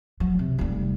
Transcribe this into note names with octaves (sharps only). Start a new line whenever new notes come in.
F#3
C3
F1 G3